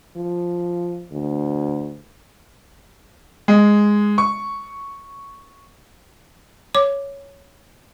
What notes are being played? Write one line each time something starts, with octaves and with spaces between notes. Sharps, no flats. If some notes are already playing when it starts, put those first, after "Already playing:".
F3
D2
G#3
C#6
C#5 D6